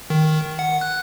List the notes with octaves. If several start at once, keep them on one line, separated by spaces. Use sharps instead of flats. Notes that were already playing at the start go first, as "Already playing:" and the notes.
D#3
F#5
F#6